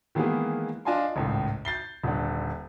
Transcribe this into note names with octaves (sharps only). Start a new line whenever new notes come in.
D#3 E3 G#3 A#3 B3 G#4
D4 F4 D#5 G#5 A5 C6
G#1 C#2 A2
G6 A6 C7 G7
D#1 D3